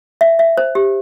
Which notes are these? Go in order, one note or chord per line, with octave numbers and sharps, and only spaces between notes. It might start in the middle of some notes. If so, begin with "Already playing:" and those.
E5
E5
C5
G4